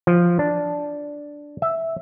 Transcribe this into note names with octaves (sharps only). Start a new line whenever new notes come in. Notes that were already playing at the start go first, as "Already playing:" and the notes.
F3
D4
E5